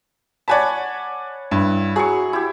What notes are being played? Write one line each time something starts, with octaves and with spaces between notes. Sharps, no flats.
C#5 D5 F#5 G#5 A5 B5
G2 E4
F#3 G#4 C#6
E4 G4